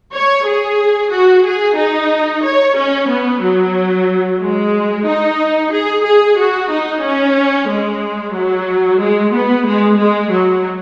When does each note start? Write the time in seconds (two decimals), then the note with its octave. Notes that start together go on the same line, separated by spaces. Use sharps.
0.13 C#5
0.45 G#4
1.11 F#4
1.45 G#4
1.76 D#4
2.43 C#5
2.76 C#4
3.09 B3
3.41 F#3
4.40 G#3
5.06 D#4
5.71 G#4
6.04 G#4
6.37 F#4
6.70 D#4
7.03 C#4
7.68 G#3
8.35 F#3
9.00 G#3
9.33 B3
9.66 G#3
9.99 G#3
10.31 F#3